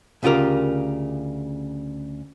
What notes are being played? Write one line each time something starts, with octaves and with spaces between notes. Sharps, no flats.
D2 C#3 F4 G4 A#4